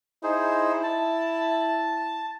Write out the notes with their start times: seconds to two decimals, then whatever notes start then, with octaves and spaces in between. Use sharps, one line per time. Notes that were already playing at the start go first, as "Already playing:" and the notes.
0.23 D#4 E4 G#4 C5
0.83 A5